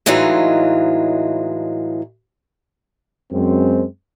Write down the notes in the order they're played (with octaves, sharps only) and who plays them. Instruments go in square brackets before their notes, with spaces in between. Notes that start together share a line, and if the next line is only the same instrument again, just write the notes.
[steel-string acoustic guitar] A2 E3 F#3 G#3 D#4 F4
[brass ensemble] F#2 G#3 C4